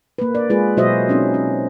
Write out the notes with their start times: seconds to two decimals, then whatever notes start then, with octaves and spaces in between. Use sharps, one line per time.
0.18 A#3 B4
0.35 D5
0.50 G#3 F4 G#4 B4
0.77 B2 F#3 F#4 C5 D#5 E5
1.09 C4 C#4 D#4
1.34 C#4